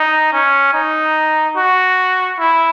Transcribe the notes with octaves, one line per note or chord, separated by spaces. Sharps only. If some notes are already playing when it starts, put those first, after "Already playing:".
Already playing: D#4
C#4
D#4
F#4
E4